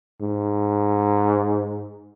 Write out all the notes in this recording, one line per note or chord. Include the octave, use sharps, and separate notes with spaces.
G#2